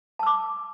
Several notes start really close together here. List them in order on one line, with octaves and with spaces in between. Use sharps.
A5 E6 D6